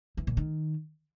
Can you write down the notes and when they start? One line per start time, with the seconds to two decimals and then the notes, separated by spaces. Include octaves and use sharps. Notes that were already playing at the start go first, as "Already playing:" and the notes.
0.17 E3
0.27 A#2
0.37 D#3